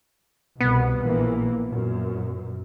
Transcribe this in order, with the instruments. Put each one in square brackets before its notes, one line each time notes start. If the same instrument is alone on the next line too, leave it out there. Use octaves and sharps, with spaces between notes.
[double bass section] C2 B2 [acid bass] B3
[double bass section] A#1 E3 A#3
F#2 A#2